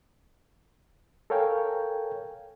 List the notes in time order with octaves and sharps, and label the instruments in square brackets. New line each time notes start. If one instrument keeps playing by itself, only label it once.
[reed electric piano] A4 A#4 C#5 F5 G5 G#5